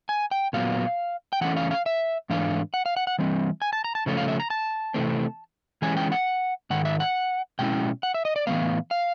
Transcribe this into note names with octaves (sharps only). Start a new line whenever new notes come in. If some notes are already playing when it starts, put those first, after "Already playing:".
G#5
G5
A#2 F#3 B3 F5
G5
E3 A3 C#4 F#5
F5
F5
E5
G#2 E3 A3 D4 F5
F#5
F5
F#5
F#5
E3 G3 C4
G#5
A5
A#5
A5
C#3 F3 A3 C#4 F4
F5
E5
A#5
A5
C3 E3 A3 C4
E3 G#3 C#4 G#5
G5
F#5
G#2 D#3 F#5
E5
F#5
B2 G#3 C#4 E4 G5
F#5
E5
D#5
D5
A2 E3 G#3 B3 F5
F5